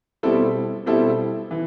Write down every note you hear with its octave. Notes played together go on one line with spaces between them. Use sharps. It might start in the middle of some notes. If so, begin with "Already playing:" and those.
B2 G3 C4 E4 A4
B2 G3 C4 E4 A4
E3